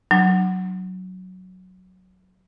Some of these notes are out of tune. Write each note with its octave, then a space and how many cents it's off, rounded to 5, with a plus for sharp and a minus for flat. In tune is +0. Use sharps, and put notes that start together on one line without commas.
F#3 +0 D4 +35